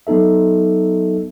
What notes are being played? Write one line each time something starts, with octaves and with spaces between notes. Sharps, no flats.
F#3 B3 D#4 A4 E5